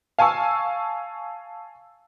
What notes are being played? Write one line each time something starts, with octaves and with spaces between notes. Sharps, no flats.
F5 G#5 A5 C#6 E6